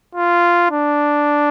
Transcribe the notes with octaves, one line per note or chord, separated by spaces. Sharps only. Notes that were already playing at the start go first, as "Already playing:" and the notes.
F4
D4